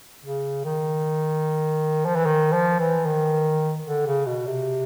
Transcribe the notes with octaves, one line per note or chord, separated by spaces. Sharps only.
C#3
D#3
F3
E3
D#3
F3
E3
D#3
D3
C#3
B2
C3